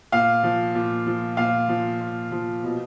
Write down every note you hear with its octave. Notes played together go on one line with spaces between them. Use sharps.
A#2 F5
F3
A#2
F3
A#2 F5
F3
A#2
F3
B2